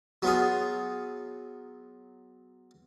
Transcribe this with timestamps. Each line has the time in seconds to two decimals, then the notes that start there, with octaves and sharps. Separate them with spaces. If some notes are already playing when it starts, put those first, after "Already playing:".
0.22 F#3 B3 F4 G#4